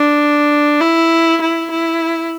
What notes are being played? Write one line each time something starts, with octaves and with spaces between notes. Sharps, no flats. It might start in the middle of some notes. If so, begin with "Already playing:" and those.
Already playing: D4
E4
E4
E4